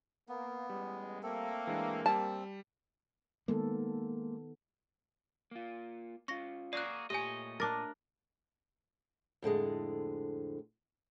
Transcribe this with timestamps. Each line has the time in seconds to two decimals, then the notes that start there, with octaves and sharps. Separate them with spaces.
0.29 A#3 B3
0.70 A1 G3 G#3
1.23 A3 A#3 C4 A4
1.67 E3 G#3 D4
2.06 G3 C4 A5
3.48 D#3 G#3 A#3 B3 A4
5.51 A#3 F4
6.28 C#4 F4 C#6 A#6
6.73 A#3 F#4 G#4 D5 F#6
7.10 A#2 A3 G4 C#5 D#5 G#5
7.60 D4 A#4 D6 A6
9.42 F2 A2 D3 G#3